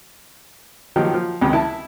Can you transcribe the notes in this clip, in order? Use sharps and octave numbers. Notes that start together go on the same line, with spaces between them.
D#3 F3 F#3 G4
F3
C#2 C3 D#3
E4 A5